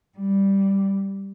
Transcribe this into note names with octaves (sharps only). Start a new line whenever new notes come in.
G3